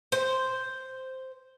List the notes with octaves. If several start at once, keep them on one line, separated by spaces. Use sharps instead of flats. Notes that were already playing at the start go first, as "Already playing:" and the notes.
C5